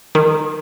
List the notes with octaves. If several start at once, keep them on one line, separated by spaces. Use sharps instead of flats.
D#3